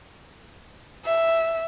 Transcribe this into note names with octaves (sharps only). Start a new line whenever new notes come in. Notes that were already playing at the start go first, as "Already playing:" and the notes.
E5